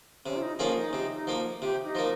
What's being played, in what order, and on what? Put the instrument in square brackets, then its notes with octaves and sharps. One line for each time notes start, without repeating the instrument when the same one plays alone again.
[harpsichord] C3 [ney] C#4
[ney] F4
D#4
[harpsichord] F3 A#3 F4 G#4 [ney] C#4
[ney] D#4
[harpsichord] C3
F3 A#3
[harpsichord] C3 [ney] G4
[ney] D#4
[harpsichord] F3 A#3